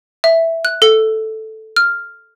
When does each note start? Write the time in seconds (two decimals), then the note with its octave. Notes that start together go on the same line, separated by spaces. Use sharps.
0.24 E5
0.65 F#6
0.82 A4
1.76 F6